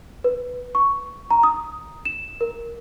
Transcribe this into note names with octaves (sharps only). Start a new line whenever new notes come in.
B4
C#6
A#5
D#6
E7
A#4